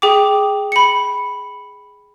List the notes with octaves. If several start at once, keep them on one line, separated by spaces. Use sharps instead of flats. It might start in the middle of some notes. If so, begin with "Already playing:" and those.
G#4 G5 D6
B5 C#7